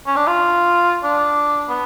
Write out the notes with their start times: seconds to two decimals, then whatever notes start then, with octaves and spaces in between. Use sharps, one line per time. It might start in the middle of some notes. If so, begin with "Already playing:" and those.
0.07 C#4
0.17 D4
0.27 F4
1.04 D4
1.69 B3